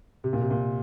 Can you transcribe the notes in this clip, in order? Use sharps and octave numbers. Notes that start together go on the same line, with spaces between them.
C3
A#2
C3
A#2